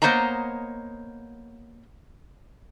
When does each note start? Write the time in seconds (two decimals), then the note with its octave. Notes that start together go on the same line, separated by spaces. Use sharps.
0.02 A#3 B3 C5 C#5 D#5 A#5